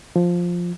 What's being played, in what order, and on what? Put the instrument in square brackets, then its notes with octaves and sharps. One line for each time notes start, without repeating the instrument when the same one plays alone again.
[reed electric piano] F3